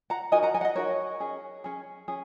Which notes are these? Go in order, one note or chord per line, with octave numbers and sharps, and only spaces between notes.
F#5 A#5
D#4 F#4 A#4 D#5 G#5
F#5 A#5
D#5 G#5
F#5
D#5
D#4 F#4 A#4 C#5
C#4 G#4
C#4 G#4
C#4 G#4